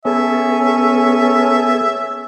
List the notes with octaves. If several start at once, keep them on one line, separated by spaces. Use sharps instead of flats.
B3 C#4 G#4 A4 E5